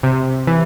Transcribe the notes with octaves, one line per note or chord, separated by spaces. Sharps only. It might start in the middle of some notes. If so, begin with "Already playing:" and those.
C3
E3